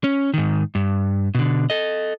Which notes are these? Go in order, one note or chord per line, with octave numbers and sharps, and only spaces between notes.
C#4
G#2 D#3
G2
B2 D3
A4 D#5